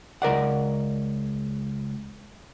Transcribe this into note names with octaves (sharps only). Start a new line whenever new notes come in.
C#2 A#4 D5 F#5